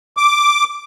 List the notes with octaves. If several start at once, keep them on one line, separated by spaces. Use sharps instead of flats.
D6